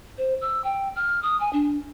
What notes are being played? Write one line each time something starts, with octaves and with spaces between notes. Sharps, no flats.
C5
E6
G5
F6
D#6
G#5
D4